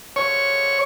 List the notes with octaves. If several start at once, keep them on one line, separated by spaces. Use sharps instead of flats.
C#5